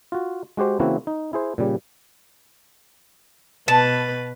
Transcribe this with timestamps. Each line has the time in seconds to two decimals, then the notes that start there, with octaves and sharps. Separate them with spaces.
0.12 F4 F#4
0.57 G#3 F#4 G4 C5
0.80 C#3 E3 A#3 C4 E4 F#4
1.07 D#4
1.33 E4 G#4 C5
1.58 A#2 C#3 G3
3.68 B2 B4 A5